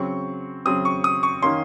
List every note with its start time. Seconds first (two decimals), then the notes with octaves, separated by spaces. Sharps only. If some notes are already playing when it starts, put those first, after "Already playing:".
Already playing: C#3 F#3 C4 C#6
0.65 C#3 F#3 C4 D#6
0.85 C#6
1.04 D#6
1.23 C#6
1.42 D#3 A#3 C#4 C6